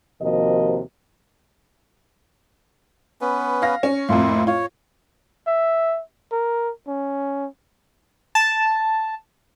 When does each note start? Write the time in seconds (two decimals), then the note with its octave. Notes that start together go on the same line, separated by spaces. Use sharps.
0.22 D#2 C3 F3 F#4 A#4 D#5
3.21 B3 C#4 B4
3.62 F5 A#6
3.83 C#4
4.09 F2 A2 A#3 E4 F4
4.47 F4 C#5
5.47 E5
6.32 A#4
6.88 C#4
8.35 A5